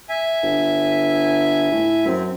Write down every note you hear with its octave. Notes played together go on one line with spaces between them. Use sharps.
E5 G#5
G1
A2
F#2 C4